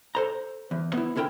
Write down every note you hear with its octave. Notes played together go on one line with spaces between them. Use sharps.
A4 C5 A#5
E2
B3 E4
D3 C#4 E4 A#4 G5